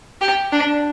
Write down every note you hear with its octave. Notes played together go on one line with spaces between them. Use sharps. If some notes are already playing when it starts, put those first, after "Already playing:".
G4
D4